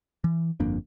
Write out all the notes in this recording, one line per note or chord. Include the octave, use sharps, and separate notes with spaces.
E3
G1 F2 A#3 D4